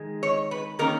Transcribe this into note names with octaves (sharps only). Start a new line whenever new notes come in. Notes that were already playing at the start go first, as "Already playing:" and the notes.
Already playing: D#3 G#3
C#5
B4
D#3 A#3 C#4 A#4